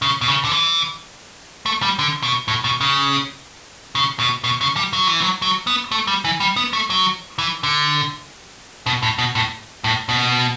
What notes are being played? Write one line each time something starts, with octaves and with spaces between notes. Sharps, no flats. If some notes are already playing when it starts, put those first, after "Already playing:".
C#3
B2
C#3
D3
E3
A3
G3
D3
B2
A2
B2
C#3
C#3
B2
B2
C#3
G3
F#3
E3
F#3
F#3
B3
A3
G3
E3
G3
B3
A3
F#3
E3
D3
B2
A2
B2
A2
A2
B2